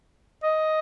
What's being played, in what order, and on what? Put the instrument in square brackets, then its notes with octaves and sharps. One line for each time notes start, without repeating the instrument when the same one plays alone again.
[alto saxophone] D#5